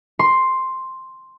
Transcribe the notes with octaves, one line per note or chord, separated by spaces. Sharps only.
C6